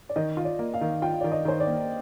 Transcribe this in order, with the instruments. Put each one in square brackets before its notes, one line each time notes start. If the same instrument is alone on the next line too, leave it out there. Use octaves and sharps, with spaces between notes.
[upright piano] D5
[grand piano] D#3 [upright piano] D#5
[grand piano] F4
[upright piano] D5
[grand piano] A#3
[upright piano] F5
[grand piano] D#3
[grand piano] F4 [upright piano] G5
[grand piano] D#3 [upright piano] D5
[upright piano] D#5
[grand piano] D#3 [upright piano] C5
[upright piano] D5
[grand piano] A#3